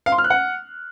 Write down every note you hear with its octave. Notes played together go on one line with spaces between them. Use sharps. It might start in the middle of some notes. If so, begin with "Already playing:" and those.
F5
C6
F6
F#6
F#5